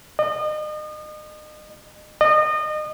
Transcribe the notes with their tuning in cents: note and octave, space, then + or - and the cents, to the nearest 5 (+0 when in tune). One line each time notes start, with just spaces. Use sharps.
D#5 -35
D#5 -30